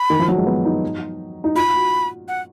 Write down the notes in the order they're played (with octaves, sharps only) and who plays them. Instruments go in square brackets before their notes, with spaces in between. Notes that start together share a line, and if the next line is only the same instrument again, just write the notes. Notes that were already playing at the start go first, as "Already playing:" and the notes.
Already playing: [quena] B5
[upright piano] D#3
F3
F#3
G#3
B3
D#4
D#4
[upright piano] F4 [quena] B5
[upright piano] F#4
[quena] F#5